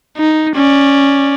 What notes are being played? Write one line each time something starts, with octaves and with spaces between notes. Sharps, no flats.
D#4
C#4 D5